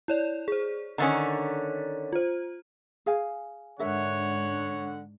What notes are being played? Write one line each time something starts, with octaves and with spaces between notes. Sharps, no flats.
E4 C#5 D5
G#4 C5
D3 D#3 C#4 A#5 A6 B6
F4 C5
G#4 F5 G#5
G#2 D3 D4 A#4 C#5 E5 F#5